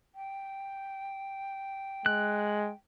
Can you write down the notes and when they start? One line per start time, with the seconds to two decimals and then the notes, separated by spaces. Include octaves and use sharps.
0.15 G5
2.06 G#3 F#6